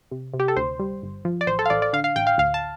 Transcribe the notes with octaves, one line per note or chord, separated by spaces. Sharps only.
C3
C3
G4
A4
D2 C5
G3
G1
F3
D5
A1 C5
A4
F5
A1 D5
D5
D3 F5
F5
A1 G5
F5
D2 F5
A5